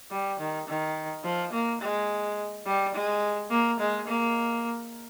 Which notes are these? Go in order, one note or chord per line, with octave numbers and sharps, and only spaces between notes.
G3
D#3
D#3
F3
A#3
G#3
G3
G#3
A#3
G#3
A#3